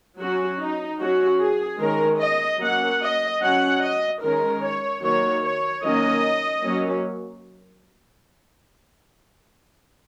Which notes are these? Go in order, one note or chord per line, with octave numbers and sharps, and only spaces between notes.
F#3 C#4 F#4
D#4
F#3 C#4 F#4
G#4
D#3 G#3 C#4 A#4
D#5
F#3 A#3 C#4 F#5
D#5
F#3 C#4 F#5
D#5
D#3 G#3 C#4 A#4
C#5
D#3 F#3 A#3 C#5
C#5
D#3 F#3 A#3 C#4 D#5
F#3 A#3 C#4